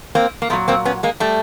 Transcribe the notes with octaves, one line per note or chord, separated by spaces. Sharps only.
A#3 C4
A#3
A#2 F#3 A3 B3
A#3 C4
B3 C#4
G#3 A#3
G3 A3